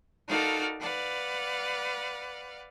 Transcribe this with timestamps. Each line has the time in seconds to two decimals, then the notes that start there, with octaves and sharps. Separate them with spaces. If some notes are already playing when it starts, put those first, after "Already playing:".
0.29 D#4 F#4 A4 A#4 D5 F5
0.80 B4 D5 F5 F#5